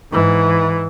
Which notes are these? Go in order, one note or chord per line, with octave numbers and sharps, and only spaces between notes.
G#2 E3